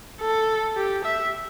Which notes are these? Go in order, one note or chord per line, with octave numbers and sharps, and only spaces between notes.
A4
G4
E5